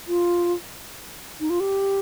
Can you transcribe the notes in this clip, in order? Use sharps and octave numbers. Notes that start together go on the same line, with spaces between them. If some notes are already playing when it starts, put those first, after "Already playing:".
F4
D#4
F4
G4